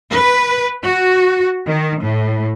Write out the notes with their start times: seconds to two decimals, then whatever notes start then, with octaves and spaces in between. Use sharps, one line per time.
0.11 B4
0.84 F#4
1.67 D#3
2.01 A2